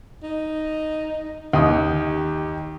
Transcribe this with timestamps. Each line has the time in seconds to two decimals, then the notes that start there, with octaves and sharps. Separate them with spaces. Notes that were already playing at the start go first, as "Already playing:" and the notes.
0.23 D#4
1.53 D#2 G4 D#6